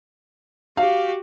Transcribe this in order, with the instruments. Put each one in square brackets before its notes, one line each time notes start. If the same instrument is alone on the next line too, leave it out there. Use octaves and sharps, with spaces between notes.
[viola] F#4 G4 [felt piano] F5